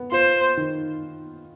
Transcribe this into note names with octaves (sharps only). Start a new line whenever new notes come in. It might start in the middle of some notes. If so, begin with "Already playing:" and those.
Already playing: B3
F4 C5
D#3